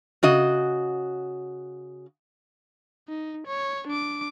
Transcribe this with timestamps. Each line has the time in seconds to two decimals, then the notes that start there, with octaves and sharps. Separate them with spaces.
0.23 C#3 F#4 D#5
3.09 D#4
3.47 C#5
3.87 D4 D6